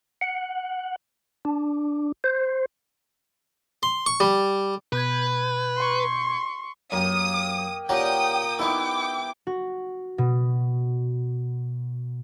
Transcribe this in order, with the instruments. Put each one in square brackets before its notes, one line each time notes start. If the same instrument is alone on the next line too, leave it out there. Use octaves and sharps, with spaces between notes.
[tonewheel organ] F#5
D4
C5
[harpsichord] C6
C#6
G3
[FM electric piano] B2 G6 G#6 [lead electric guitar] B4
[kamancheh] C6 C#6
[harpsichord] F#2 [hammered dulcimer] A#3 G4 [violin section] D#6
[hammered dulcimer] A#2 A#5 [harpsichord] C#4 F#4 G4 [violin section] G5 D#6
[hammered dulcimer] B3 E4 G4 [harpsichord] D#4 A4 [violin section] G5 D6
[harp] F#4
B2